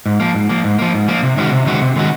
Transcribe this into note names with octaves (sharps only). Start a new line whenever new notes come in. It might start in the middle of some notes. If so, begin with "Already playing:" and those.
G#2
F3 A#3
G#2
F3 A#3
G#2
F3 A#3
G#2
F3 A#3
C3
D#3 G#3 C#4 F#4
C3
D#3 G#3 C#4 F#4
C3
D#3 G#3 C#4 F#4